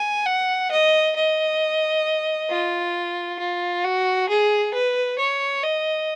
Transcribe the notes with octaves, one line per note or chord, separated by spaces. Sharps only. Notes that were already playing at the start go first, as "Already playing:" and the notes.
Already playing: G#5
F#5
D#5
D#5
F4
F4
F#4
G#4
B4
C#5
D#5